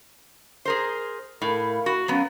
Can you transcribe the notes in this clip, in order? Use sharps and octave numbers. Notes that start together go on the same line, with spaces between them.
G#4 A#4 C5
A2 A#4 F5 B5
F#4
F#3 B3 C#4 A#4 F5